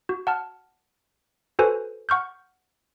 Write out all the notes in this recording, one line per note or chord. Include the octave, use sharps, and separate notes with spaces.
F#4
F#5 A5 F6
F#4 A4 B4 C5 G#5
F#5 C#6 F6 G6